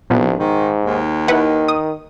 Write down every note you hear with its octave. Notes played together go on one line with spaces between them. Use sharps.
C2 G2 A#2 F3 B3
G#2 D#3
D#2
D#3 E4 B4 F#5
D#6